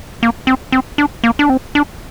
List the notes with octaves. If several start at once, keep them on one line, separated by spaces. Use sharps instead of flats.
A#3
C4
C4
D4
A#3
D4
C4
D4